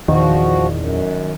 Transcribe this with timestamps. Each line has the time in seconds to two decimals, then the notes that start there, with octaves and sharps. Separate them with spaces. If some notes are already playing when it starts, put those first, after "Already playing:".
0.08 E2 A#2 D#3 F3 F#4
0.77 F#2